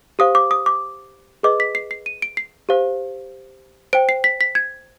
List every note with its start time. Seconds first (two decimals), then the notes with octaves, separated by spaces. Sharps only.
0.19 G4 C5 F5 D#6
0.35 D6
0.51 D#6
0.66 D6
1.43 G#4 B4 D#5 D6
1.60 B6
1.75 C7
1.91 C7
2.06 D#7
2.22 D7
2.37 C7
2.69 G4 C5 F5
3.93 C5 G5 D7
4.09 C7
4.24 B6
4.41 B6
4.55 G#6